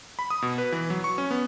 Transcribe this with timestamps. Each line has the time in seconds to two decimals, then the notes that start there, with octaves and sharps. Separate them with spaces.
0.19 B5
0.30 D#6
0.42 B2
0.58 B4
0.72 E3
0.90 F#3
1.04 C#6
1.18 C#4
1.31 B3